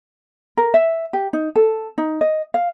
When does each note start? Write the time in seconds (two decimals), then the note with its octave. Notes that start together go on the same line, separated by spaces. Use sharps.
0.57 A#4
0.74 E5
1.13 G4
1.33 D#4
1.56 A4
1.98 D#4
2.21 D#5
2.54 F5